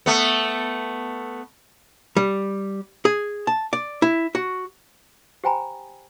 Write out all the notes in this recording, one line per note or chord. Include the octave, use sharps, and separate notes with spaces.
A3 B3
G3
G#4
A5
D5
E4
F#4
G4 C5 G5 G#5 A#5 B5